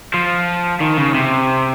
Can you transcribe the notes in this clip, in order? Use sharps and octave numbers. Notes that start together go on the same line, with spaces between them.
F3
D#3
C#3
C3